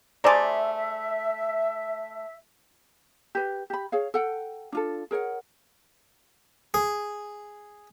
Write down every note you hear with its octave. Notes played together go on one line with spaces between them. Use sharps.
A3 G#4 C5 D5 E5 A#5
G4 B4
G4 B5
G#4 C#5 F5
A4 F#5 G5
D4 F4 A4
G#4 A#4 C#5 F#5
G#4